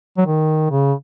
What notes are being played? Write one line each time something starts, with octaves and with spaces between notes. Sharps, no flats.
F#3
D#3
C#3